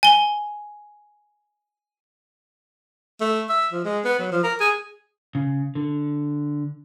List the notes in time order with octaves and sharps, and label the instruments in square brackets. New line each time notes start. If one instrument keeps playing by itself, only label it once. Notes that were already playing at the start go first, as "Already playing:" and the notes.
[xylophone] G#5 G7
[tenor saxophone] A3
E5
F3
G#3
B3
F#3
F3
A#4
G#4
[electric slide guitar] C#3
D3